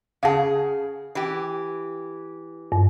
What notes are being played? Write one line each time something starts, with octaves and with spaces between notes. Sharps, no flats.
C#3 G#4 F5 F#5 A5
E3 G4
G2